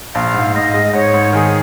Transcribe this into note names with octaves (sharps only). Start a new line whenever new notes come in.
A#1 F5
G#2
G#2 D#5
G#3
G#2 C#5
G#2
D#3 G#4